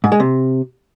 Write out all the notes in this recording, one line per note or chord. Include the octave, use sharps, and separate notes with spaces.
G#2
G#3
C3